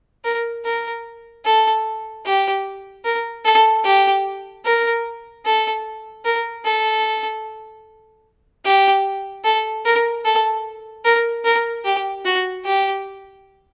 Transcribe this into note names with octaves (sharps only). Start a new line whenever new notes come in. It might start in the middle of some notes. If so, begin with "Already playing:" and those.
A#4
A#4
A4
G4
A#4
A4
G4
A#4
A4
A#4
A4
G4
A4
A#4
A4
A#4
A#4
G4
F#4
G4